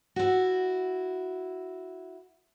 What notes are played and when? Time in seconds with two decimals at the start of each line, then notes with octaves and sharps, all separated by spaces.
0.16 E4 F#4